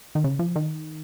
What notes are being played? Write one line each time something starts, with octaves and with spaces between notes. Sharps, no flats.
D#3
C#3
F3
D#3